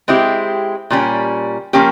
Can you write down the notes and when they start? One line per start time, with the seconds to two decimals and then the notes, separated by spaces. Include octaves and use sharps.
0.08 G#3 C4 E4 G4
0.90 A#2 G3 C#4
1.73 F3 A#3 C#4 G4